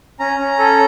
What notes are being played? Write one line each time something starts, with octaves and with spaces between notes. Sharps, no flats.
C#4 A#5
C#4
A4